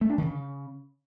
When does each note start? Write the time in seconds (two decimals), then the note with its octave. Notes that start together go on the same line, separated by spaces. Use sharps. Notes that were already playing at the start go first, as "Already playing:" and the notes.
0.01 A3
0.10 D4
0.18 D#3
0.26 C#3